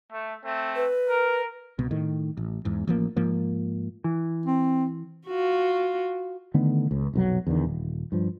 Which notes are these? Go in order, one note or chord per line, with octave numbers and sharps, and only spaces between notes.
A3
A3 C4
B4
A#4
C2 B2
A2 D#3
A1
E2 G#2
A1 F3 A#3
G#2 F3 A#3
E3
C4
F4 F#4
D3 D#3 A3 B3
C#2
F1 B1 F#3
E2 D3 D#3
D#1
G2 F3